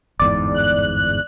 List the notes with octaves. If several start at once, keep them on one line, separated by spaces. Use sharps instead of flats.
G1 E2 G#2 D5
F#6